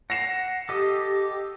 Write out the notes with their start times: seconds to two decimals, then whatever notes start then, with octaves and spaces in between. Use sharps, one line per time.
0.10 F#5 A#6 C7 E7
0.69 G4 A4 D#5 D#6